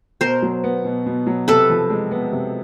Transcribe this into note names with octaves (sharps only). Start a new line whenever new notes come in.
B2 A#4 C5
F#3
B3
B2
B2
F#3
C3 A4 B4
F3
G#3
B3
C3